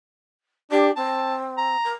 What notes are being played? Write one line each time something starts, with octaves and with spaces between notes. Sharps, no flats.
D4 G4
C4 A5
A#5
A#4